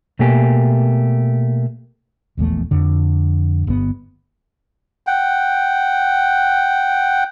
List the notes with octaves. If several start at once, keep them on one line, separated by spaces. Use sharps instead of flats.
B2 A3 A#3 G4 G#5
D#1 A#1 E2 A3
F2 D3
G1 G2 B3
F#5 G5